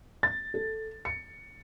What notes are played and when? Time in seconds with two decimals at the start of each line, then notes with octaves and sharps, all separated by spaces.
0.23 A6
0.54 A4
1.05 C#7